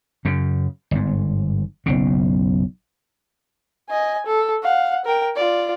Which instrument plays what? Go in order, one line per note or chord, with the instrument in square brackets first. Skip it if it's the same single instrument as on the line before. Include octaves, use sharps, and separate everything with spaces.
[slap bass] F#2 C#3
G1 G#2
F#1 B1 C#3
[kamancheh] D#5 G#5
A4
F5 F#5
A#4 G5
F4 D5